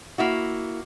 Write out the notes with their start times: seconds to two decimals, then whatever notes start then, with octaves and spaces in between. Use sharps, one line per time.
0.18 A#3 E4 F#4